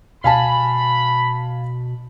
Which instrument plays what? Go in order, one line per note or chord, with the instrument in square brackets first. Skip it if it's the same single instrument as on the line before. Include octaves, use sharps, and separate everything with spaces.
[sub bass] B2 [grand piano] F5 G#5 A5 [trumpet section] B5